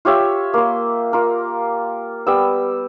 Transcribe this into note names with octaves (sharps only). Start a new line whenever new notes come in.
F4 G4 C#5 E5
A#3 C6
F4 A#4
G3 B3 E6